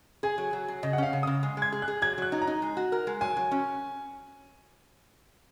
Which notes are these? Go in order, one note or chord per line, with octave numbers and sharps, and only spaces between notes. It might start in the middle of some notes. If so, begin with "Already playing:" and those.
G#4 G#5
F#3
F#3
G#4
C#3 D#5
F#5
C#4 F5
C#3
C#3 D#6
G#3
G#3 G#6
G#4
F#6
G#4
F#3 G#6
F#3 F#6
D#4
A#5
D#4
G#3
F#4
A#4
G#3
F#3 G#5
F#3
C#4